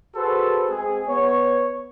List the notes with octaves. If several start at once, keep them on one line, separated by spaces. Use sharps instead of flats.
F#4 G#4 A4 B4 C5
G#3 C4 G#4
B3 C#5